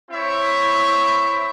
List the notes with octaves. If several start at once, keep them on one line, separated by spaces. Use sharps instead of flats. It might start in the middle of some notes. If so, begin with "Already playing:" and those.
C4 E4 C#5 E5